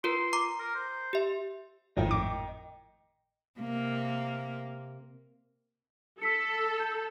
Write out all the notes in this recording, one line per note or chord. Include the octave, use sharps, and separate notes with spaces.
F4 A#4 B4 C6
A#5 D6 C7
A#4
C5
G4 E5
G#1 F2 A2 D#5 G5
D6
C3 A#3
A4 E6 B6 C#7
G6